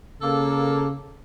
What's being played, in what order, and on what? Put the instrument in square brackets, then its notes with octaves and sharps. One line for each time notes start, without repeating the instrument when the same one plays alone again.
[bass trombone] C#3 [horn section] A#3 A4